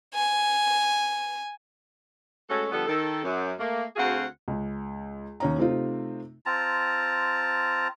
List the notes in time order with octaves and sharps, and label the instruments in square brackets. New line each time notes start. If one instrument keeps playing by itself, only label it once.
[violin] G#5
[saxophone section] G#3 A3 C#4 F#4 A4
D3 F3 G3 B3 A4
D#3 A4
F#2
A3 A#3
D2 C4 F#4 G#4 F5 F#5
[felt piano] C#2
D#2 C#4 A#5
C3 A3 C4 D#4 F4
[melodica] C4 F4 A5 A#5